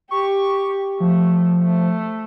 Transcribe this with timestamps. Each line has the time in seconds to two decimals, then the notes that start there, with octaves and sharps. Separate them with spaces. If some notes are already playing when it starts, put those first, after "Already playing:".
0.11 G4 C#6
1.00 F3 A3
1.63 A3